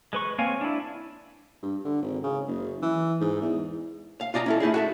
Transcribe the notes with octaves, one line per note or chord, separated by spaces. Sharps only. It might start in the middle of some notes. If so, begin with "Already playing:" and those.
G#3 B4 C#6
A#3 C4 C#5 F5 G#5
D4 E4
G2
D3
G#1
C#3
F#1
E3
G#2
E2
F5
F4 D5 D#5 A5 A#5
C#4 E4 A4
A3 D#4 E4 G#4
F#4 A4 E5